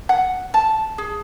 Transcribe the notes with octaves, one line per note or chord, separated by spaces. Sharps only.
F#5
A5
G#4